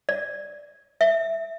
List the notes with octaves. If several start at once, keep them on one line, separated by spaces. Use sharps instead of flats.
D5
E5